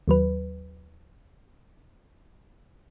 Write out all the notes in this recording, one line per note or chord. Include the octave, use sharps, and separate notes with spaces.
D#2 F#3 B4